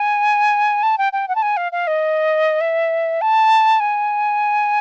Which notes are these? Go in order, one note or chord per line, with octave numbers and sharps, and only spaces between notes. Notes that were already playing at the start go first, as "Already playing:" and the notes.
Already playing: G#5
A5
G5
G5
F#5
A5
G#5
F5
F5
D#5
E5
A5
G#5